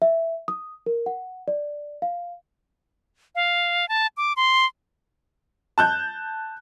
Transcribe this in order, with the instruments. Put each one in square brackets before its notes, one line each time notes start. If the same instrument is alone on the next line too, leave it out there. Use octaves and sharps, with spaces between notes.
[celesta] E5
D#6
A#4
F#5
D5
F5
[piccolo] F5
A5
D6
C6
[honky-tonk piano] A5 F#6 G6